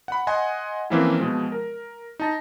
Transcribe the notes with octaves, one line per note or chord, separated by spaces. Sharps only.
F#5 B5
D#5 F#5 G#5 C6
E3 F3 A#3 C4 C#4 E4
B2 F3 G#3
A#4
D#4 A5 A#6